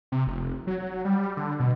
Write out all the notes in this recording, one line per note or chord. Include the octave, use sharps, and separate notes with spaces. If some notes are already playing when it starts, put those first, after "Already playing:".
C3
F1
F#3
G3
D3
B2